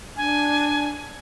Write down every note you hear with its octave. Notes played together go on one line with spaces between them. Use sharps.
D4 G#5